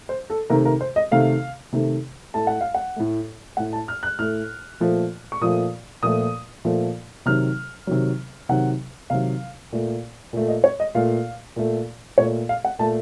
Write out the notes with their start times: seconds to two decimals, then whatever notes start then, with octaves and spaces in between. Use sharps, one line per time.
0.09 C5
0.30 A4
0.50 C3 D#3 A3 A#4
0.65 A#4
0.81 C5
0.96 D#5
1.11 C3 D#3 A3 F5
1.73 C3 D#3 A3
2.34 A2 A3 A5
2.47 F#5
2.61 F5
2.74 F#5
2.96 A2 A3
3.57 A2 A3 F#5
3.73 A5
3.88 F6
4.03 F#6
4.18 A2 A3 F6
4.80 A#2 F3 A3
5.32 C#6
5.41 A#2 F3 A3 D#6
6.03 A#2 F3 A3 D#6
6.65 A#2 F3 A3
7.26 C3 D#3 F#3 F6
7.87 C3 D#3 F#3
8.49 C3 D#3 F#3 F#5
9.10 C3 D#3 F#3 F5
9.72 A#2 A3
10.33 A#2 A3
10.48 D#5
10.64 C#5
10.80 D#5
10.95 A#2 A3 F5
11.56 A#2 A3
12.18 A#2 A3 C#5
12.49 F5
12.65 F#5
12.79 A#2 A3 A5